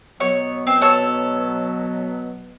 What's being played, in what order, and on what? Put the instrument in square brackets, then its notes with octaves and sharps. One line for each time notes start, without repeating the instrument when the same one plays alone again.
[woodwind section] B2 F#3 B3 [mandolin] C#5
[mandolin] C4
A4 C#5 E6